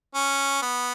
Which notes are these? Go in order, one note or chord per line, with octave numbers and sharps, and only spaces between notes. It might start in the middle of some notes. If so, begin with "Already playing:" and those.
C#4
B3